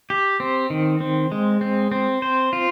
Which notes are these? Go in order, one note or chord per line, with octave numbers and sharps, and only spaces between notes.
G4
C4
D#3
C4
G#3
C4
C4
C5
F4